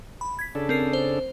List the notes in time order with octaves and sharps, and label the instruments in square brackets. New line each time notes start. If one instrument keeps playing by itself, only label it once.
[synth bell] B5
G#6 B6
[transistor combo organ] C#3 D4 A4
[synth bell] C4 A#4 C7
C5